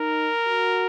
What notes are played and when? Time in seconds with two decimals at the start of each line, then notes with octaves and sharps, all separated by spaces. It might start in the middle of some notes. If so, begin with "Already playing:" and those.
Already playing: D#4 A#4
0.46 F#4